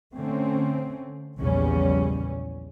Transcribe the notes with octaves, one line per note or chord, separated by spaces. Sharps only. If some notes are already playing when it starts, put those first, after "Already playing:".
D3 A3 C4 C#4
A#1 E2 C#3 E3 G3 C#4